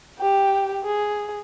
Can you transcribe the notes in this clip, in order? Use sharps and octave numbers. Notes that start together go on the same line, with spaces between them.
G4 G5
G#4